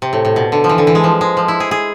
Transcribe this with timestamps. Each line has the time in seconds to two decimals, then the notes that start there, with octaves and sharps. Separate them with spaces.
0.02 C3
0.13 A2
0.25 A2
0.36 B2
0.52 D3
0.64 F3
0.69 E3
0.78 D3
0.87 E3
0.95 G#3
1.04 F3
1.21 G#3
1.37 F3
1.48 E4
1.60 G#4
1.71 G#4